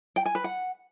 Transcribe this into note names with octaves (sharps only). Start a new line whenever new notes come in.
G5
G#5
B4
F#5